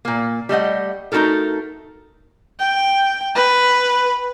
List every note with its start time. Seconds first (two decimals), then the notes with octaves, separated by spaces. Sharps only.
0.05 A#2 A#3
0.49 G3 A3 D#5 F#5
1.12 A3 D#4 E4 F#4 A4 A#4
2.59 G5
3.36 B4